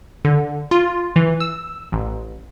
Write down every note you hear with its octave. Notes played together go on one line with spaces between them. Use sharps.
D3
F4
E3
E6
A1